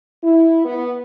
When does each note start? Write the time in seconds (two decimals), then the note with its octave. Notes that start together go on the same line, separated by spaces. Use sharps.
0.23 E4
0.65 B3